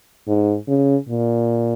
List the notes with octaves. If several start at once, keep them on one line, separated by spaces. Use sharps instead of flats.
G#2
C#3
A#2